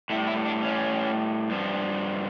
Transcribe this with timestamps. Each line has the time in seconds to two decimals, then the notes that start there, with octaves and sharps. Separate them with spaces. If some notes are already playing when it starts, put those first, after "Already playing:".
0.10 A2 E4
0.13 G3
0.27 E4
0.46 D4
0.63 C#4
1.50 G2 F3